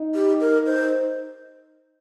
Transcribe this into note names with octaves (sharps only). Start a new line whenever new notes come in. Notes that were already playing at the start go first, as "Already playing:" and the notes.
Already playing: D#4
G4
A#4
C5